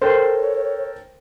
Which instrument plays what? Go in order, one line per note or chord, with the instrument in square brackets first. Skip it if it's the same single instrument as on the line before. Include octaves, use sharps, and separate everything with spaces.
[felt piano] A4 A#4 G5 [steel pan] C5 [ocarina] C#5